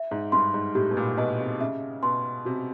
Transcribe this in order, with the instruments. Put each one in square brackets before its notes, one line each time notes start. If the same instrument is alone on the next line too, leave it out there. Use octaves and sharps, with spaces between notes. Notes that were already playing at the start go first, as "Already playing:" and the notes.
Already playing: [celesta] E5
[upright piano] G#2
[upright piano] G2 [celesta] C6
[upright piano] G#2
[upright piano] A2 [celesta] G4
[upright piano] B2
A#2
[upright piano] B2 [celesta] D#5
[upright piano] C3
[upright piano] C#3 [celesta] E5
[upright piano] B2 [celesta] C6
[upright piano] C3 [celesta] F#4